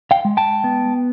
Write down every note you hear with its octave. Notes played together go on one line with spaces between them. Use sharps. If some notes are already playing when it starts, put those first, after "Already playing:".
F5 G5
G#3
G5 A5
B3